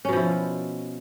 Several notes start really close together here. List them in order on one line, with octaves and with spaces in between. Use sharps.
C#4 B2 F3 E4